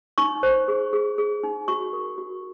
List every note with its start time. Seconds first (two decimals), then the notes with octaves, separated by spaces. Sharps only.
0.18 D#4 C#6
0.43 C5
0.68 G#4
0.93 G#4
1.18 G#4
1.43 D#4
1.68 F#4 C#6
1.93 A#4
2.18 F#4